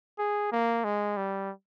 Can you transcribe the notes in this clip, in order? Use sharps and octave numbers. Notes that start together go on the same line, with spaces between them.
G#4
A#3
G#3
G3